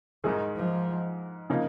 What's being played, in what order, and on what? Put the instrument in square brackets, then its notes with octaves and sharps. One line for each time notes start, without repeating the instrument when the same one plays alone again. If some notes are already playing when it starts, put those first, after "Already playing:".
[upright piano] G#2 G#3 D#4 G#4 [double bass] D#3
[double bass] F3
[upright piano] C#3 F3 A#3 D#4